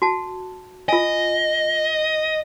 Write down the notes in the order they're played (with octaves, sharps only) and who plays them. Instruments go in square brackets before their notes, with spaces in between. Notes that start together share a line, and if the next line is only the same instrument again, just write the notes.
[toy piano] F#4 A5
[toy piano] F4 G#5 [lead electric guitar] D#5